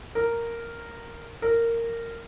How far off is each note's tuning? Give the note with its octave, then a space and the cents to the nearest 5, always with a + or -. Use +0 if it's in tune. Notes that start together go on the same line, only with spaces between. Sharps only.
A#4 -5
A#4 -15